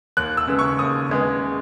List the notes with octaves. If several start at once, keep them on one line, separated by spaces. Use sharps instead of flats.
D#2 F#6
E6
C#3 G#3 B3
C#6
D#2 D#6
C#3 G#3 B3